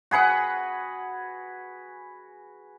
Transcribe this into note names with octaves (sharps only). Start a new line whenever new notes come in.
F#4 G#4 B4 F#5